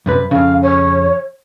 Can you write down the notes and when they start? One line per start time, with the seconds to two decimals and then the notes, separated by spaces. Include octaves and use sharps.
0.06 F#2 C3 B4
0.31 F2 C#3 F5
0.62 C#5